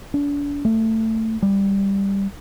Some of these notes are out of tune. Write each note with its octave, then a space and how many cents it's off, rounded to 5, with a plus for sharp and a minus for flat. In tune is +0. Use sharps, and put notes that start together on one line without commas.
D4 -40
A3 +20
G3 +10